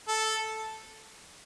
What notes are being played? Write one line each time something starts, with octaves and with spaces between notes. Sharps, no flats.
A4